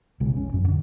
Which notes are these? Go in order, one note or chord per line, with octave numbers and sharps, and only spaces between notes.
B1 C#3 G#3
F1 C#4
A1 F#2
F2 D3